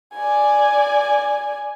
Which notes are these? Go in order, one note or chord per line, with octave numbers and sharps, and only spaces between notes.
D5 G#5